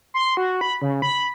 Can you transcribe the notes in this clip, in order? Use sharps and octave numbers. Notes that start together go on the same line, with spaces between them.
C6
F#4
B5
C#3
B5